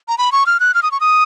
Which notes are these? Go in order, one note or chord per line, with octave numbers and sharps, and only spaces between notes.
A#5
B5
C#6
F6
F#6
F6
D#6
C#6
D#6